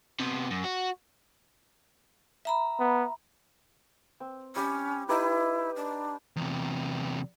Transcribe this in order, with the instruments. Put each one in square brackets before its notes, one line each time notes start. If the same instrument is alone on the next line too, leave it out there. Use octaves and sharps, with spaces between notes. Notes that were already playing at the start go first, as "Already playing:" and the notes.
[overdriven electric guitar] C3 B3
F#2
F#4
[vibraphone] E5 A#5 B5
[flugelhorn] B3
[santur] C4
[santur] G3 G4 [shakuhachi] C#4
[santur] D#4 G4 B4 [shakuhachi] E4
[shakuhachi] D4
[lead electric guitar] E2 C3